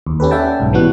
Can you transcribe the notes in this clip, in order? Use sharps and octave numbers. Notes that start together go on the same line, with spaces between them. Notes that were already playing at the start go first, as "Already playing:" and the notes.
D#2
C#4 G4 A4 B4
C#4 D5 E5 F#5 G5 A5
B1 G#2
E3 G3 B3 F#4 F#6